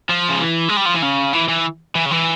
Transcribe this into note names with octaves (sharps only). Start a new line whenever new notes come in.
F3
C#3
E3
G#3
G3
F3
E3
C#3
E3
E3
E3
C#3
E3